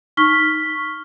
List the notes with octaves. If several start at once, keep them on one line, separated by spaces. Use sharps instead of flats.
D#4 C#6 F6 B6 G7